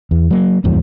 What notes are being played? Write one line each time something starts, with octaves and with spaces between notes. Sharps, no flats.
E2
F#3 A#3
D1 E2 G#2 F3